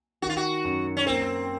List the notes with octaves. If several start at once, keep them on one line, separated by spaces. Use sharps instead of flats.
D#3 F#4
F4
F#4
F#2
C#4
A#3 C4